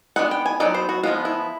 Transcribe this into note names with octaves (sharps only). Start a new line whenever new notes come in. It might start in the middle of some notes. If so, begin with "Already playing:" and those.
G#3 B3 D4 F#5
G5
G#5
F#3 B3 D#4 D5
C5
F#4
F3 G#3 B3 F4
E4